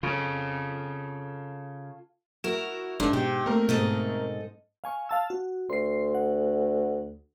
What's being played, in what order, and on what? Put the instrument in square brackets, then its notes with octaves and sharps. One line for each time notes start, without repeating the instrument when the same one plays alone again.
[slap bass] C#3 [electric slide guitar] F4 A4
[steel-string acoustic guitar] E4 A#4 [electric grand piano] F#4 E7
[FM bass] F1 [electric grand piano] G#2 [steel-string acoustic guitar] D4
[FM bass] B2 [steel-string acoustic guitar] G4
[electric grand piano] A3 C4 A#4 [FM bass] A#3
[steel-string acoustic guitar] G#2 A4 D#5 [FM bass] B2
[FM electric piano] F5 G#5 C#6
F5 A5 E6
F#4
[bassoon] D2 [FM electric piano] C6 C7
[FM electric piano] F#5